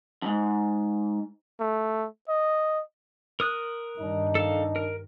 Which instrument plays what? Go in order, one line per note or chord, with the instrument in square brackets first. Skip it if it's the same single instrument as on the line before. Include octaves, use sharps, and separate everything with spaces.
[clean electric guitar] F2 G#2
[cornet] A3
D#5
[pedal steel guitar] A#4 D#6 F#6
[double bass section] G2 D#3 [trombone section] D4 D#4
[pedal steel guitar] A4 F5
A#4